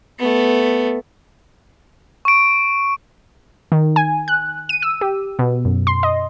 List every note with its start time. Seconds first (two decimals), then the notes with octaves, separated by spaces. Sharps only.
0.19 A3 B3
2.25 C#6 D7
3.72 D#3
3.96 G#5
4.28 F#6
4.69 D#7
4.82 E6
5.01 G4
5.39 B2
5.65 F#2
5.87 C6
6.03 D#5